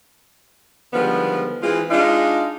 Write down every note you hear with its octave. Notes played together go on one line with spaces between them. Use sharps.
D3 D#3 F3 G3 G#3 B3
E3 G#3 C4 F4
G#3 D4 D#4 F4